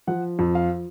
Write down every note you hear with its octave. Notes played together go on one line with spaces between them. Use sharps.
F3 F#5
F2
F5